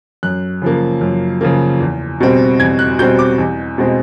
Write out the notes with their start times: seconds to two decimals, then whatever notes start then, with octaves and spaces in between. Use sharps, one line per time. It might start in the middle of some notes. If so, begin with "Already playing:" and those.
0.23 F#2 F#6
0.62 C#3 F3 A#3
1.01 F#2
1.41 C#3 F3 A#3
1.80 E2
2.20 B2 G3 C4
2.60 E2 G#6
2.79 F#6
2.99 B2 G3 C4 G6
3.19 D6
3.38 E2
3.78 B2 G#3 C4